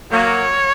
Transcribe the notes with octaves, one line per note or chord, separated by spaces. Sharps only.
F#3 A#3 C#5